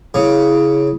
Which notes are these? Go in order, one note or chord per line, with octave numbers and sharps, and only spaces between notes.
C#3 E4